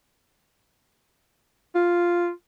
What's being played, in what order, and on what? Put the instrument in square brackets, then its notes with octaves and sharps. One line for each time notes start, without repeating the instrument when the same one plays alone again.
[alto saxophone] F4